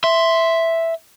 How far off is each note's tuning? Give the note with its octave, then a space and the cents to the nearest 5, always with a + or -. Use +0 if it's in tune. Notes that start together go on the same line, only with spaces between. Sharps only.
E5 +0 C6 +0